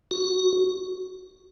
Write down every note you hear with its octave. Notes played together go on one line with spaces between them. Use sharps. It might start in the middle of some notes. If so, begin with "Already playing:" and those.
F#4